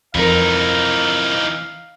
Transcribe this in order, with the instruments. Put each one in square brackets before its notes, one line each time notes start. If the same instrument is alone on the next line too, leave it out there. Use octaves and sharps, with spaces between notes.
[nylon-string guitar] F2 A#4 [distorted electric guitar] E3 D#4 [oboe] F5